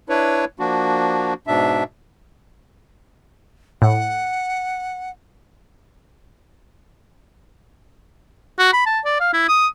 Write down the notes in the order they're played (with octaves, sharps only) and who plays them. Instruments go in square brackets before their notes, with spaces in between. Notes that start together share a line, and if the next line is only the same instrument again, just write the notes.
[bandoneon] D4 E4 B4 C#5
F3 A#3 D4 F#4
G#2 B2 D4 E5
[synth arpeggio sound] A2 [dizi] F#5
[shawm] F#4
B5
A5
D5
F5
E4
D#6